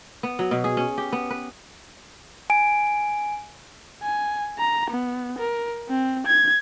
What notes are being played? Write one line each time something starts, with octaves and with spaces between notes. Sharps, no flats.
B3
F#3
B2
G#4
C#4
G4
B3
B4
G#5 D7
G#5
A#5
B3
A#4
C4
G#6